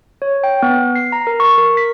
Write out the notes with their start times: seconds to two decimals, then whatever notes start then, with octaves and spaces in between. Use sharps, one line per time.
0.22 C#5
0.44 G5
0.63 B3
0.95 C7
1.12 A#5
1.27 A#4
1.40 C#6
1.58 A#4
1.77 B6